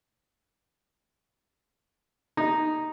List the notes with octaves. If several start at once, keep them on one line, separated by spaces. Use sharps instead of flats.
D#4